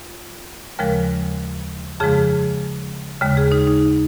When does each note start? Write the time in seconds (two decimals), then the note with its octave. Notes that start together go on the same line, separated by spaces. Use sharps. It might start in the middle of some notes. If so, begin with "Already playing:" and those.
Already playing: F4
0.79 D#2 C#3 F3 G#3 A#4
2.00 F2 C#3 F3 G#3 G#4
3.21 D#2 C#3 G#3
3.37 G#4
3.52 D#4
3.67 D#4